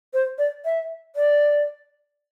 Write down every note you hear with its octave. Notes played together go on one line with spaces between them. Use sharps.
C5
D5
E5
D5